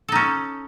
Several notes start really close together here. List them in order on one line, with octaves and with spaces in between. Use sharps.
A4 D#4 C#4